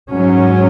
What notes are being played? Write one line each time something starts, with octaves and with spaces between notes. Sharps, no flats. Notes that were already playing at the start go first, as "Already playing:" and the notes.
G#2 F#3 C#4